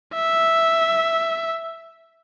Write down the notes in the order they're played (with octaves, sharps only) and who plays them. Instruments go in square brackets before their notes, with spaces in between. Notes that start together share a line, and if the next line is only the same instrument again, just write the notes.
[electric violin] E5